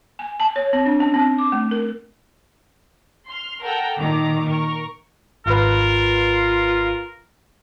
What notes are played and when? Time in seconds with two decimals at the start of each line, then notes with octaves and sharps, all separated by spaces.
0.19 G#5
0.40 A5
0.56 C#5
0.73 C4
0.86 D4
1.00 C#4
1.14 C4
1.38 D6
1.52 A3
1.71 A#4
3.28 C6 F6
3.62 A4 A#4 F#5 G5 A#5
3.99 A#2 D#3 A#5 D6
4.48 A#4 C#6
5.46 G#1 F4 A#4 B4